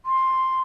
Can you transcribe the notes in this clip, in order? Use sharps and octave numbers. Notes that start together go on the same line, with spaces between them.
C6